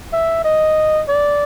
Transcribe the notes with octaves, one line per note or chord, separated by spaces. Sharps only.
E5
D#5
D5